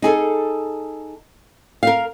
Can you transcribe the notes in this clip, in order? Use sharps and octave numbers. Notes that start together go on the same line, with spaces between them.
D#4 G#4 A4
A#4 F5